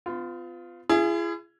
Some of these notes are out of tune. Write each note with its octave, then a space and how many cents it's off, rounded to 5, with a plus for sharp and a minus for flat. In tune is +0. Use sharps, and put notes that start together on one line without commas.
B3 +45 F4 +0
E4 +45 G#4 +0